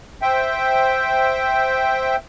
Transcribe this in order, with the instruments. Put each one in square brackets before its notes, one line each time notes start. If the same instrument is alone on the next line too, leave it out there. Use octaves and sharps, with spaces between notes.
[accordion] C5 E5 G5